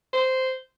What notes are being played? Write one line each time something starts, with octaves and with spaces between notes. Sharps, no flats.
C5